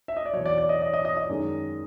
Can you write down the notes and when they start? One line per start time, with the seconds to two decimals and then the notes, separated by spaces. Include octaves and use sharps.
0.08 E5
0.17 D#5
0.26 D5
0.33 E2 B2 F#3 C#5
0.46 D5
0.58 D5
0.69 D#5
0.82 D#5
0.94 D#5
1.05 D#5
1.17 D#5
1.29 F#2 D#3 G#3